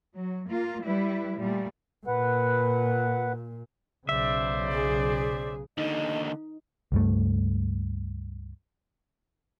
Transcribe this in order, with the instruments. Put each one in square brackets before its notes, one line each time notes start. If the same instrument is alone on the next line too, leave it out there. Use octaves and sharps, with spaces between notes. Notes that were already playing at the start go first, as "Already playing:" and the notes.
[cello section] F#3
A#3 F4
G3 E4 B4
A#2 G3 A3
[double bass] A#2 [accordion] B4 F#5
[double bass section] B1 C#3 [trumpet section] C5 D5 [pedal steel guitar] E5
[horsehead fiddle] G#4
[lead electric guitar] D#2 D3 [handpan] D#4 [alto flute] D#5
[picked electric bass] C#2 G2 A3